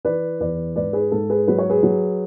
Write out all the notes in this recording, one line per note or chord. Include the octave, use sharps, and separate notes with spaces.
E3 B4 D5
E2 B4 D5
G#2 B4 D5
G#4 B4
G#2 A4
G#4 B4
F#3 B4
C#5
G#4 B4
F#3